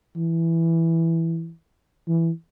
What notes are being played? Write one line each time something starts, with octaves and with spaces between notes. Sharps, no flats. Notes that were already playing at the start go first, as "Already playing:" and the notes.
E3
E3